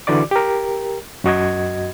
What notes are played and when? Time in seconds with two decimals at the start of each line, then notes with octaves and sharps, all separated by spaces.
0.07 D3 E3 F#4 D5 D6
0.31 G4 A#4
1.24 F#2 F#4 D#5 G#6